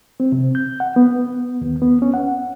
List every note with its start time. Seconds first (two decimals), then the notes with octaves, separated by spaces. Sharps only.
0.20 C4
0.32 C3
0.55 G6
0.80 F#5
0.96 B3
1.61 D#2
1.82 B3
2.02 C#4
2.14 F#5